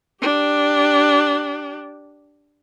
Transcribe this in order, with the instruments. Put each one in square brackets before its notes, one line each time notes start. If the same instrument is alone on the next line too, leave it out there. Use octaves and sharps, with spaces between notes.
[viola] D4 G4